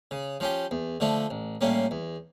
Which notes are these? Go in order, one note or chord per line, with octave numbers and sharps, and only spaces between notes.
C#3
F3 C#4 G4
E2
D3 F3 A3 D4
A1
A2 G3 A#3 C#4
E2